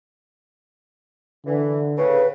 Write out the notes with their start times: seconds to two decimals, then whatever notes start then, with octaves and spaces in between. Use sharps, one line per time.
1.47 D3 E3
1.98 A2 C#3 B4